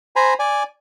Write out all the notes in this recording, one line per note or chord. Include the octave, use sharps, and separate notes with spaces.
C5 G#5 A#5 B5
D5 G#5